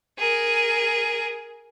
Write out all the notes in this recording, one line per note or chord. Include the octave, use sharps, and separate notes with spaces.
G#4 A#4